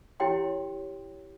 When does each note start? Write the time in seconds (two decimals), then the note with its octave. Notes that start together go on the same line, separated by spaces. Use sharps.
0.20 E4 G4 C#5 G5 C6